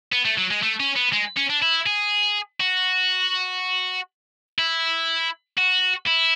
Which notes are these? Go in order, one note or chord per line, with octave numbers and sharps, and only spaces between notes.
B3
A3
F#3
G#3
A3
C#4
B3
G#3
C#4
D4
E4
G#4
F#4
E4
F#4
E4